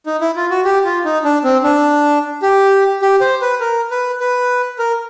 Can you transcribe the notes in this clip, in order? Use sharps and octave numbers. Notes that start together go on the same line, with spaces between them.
D#4
E4
F4
F#4
G4
F4
D#4
D4
C4
D4
G4
G4
C5
B4
A#4
B4
B4
A#4